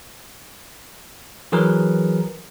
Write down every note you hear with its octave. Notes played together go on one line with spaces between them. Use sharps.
E3 F#3 G#4 A#4 B4